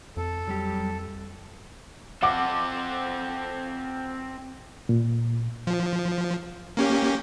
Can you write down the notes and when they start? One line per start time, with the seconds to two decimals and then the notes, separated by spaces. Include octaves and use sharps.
0.17 F2 A4
0.48 F#3 G3 G4
2.23 C4 A4 F#5 D6
4.89 A#2
5.67 F3
6.77 A#3 C#4 G4